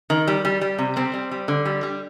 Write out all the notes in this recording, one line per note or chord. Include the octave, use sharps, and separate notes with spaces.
D#3
G3
G3
G3
C3
G3 C4
G3
G3
D3
G3
G3